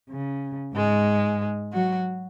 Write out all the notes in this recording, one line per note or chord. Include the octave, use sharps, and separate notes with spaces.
C#3
G#2 G#3
F#3 F#4